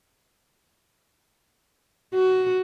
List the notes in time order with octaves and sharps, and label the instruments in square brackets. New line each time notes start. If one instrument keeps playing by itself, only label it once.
[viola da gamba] F#4